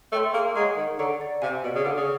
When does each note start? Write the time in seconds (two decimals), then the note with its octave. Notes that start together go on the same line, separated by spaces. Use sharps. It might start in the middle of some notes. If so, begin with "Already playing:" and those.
0.12 A3 C#5 E5 G5 C6
0.34 A#3 G#4
0.55 G#3 C#5 F#5 A#5 C#6
0.77 D#3 G#4
0.98 D3 C#5 F#5 A#5 C#6
1.21 D5
1.42 C3 F5 G#5
1.64 B2 D5
1.75 C#3
1.85 D3 F5 G#5
1.97 C#3